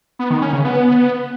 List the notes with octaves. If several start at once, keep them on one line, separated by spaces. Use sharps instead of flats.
B3
D#3
C#4
C#3
B3